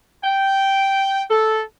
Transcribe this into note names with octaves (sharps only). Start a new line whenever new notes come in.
G5
A4